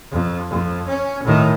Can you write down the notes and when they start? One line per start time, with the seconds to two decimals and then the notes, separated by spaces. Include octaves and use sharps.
0.12 F2
0.49 F2
0.88 C#4
1.24 A2 D#3